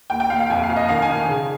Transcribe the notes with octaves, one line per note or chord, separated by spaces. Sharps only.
D#2 G5
G5
D#2 F5
F5
F2 G#5
F5
F2
D#5
D#3 F5
G#5
D#3
G#5
C#3